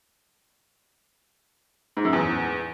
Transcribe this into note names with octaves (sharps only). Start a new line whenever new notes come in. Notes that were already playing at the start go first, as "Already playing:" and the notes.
G#2
F#2
E2